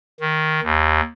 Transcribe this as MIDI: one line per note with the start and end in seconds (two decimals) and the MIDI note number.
0.20 0.60 51
0.63 1.01 39